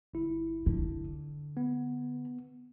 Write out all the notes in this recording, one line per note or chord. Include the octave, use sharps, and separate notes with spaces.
G1 E4
D3
B3